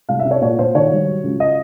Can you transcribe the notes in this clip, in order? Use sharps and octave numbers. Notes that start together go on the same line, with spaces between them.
C2 F5
E5
C3
C#5
A#2 C#5
A#2 C5
D#3 C#5
G3
F#3
C#2
D#5